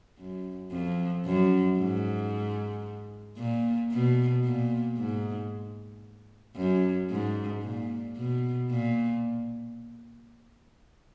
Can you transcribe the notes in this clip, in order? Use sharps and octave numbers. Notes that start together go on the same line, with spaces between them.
F#2
F2
F#2
G#2
A#2
B2
A#2
G#2
F#2
G#2
A#2
B2
A#2